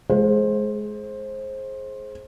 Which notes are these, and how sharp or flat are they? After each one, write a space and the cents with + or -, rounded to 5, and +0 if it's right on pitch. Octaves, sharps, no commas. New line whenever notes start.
G#3 +25 C5 +20